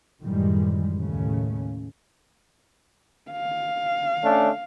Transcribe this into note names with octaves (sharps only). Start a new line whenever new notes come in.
F#2 A2 D#3 E3 G3 G#3
D#2 A2 C#3 A3 C#4
F5
A3 C#4 D4